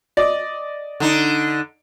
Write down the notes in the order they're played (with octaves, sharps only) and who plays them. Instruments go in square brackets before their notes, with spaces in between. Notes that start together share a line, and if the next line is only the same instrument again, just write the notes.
[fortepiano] D5 D#5
[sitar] D3 D#4